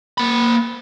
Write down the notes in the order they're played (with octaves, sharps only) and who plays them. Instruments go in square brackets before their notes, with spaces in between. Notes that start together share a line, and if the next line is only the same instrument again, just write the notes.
[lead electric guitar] A#3 B5